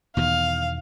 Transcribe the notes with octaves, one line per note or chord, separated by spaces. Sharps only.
E2 B2 D#3 F5